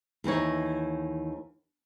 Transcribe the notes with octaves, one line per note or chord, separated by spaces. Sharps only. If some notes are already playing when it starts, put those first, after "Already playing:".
D#2 E3 D#4 C#5